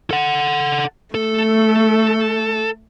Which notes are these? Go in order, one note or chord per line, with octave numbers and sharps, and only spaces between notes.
A4 F#5
A3 A4